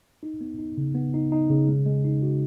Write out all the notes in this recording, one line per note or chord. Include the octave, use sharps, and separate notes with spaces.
D#4
B3
D#4
C#3
B3
D#4
D#4
C#3
G#3
G#3
D#4
F#4